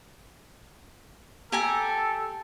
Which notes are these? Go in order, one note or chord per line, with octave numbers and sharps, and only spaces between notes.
G4 A4 G#5 A#5